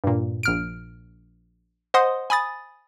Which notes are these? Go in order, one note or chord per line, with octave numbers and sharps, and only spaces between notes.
G2 A#2
A#1 F6 D7
C5 D#5 F#5 C6 D#6
G#5 B5 D#6 A6